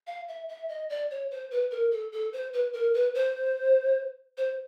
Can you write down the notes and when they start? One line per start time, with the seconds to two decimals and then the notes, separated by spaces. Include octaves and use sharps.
0.07 F5
0.28 E5
0.49 E5
0.69 D#5
0.89 D5
1.10 C#5
1.31 C5
1.51 B4
1.71 A#4
1.91 A4
2.12 A4
2.33 C5
2.53 B4
2.73 A#4
2.94 B4
3.14 C5
4.37 C5